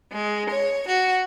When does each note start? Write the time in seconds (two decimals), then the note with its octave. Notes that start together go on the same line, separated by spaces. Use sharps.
0.12 G#3
0.51 C#5
0.88 F#4